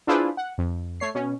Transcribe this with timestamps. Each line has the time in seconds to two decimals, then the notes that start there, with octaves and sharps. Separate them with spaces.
0.07 D4 E4 F4 G#4 B4 C5
0.37 F#5
0.58 F2
1.00 A3 C#5 C7
1.14 B2 C#4